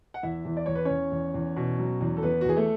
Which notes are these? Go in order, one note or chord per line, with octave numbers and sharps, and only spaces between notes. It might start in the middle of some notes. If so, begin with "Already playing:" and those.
F#5
E2 E4 E5
E2
D5
E2 C#5
B4
E2 C#4 C#5
E2
E2
B2
F#3
E2
A4
E2 B3 B4
F#4
E2 G#4
A3 A4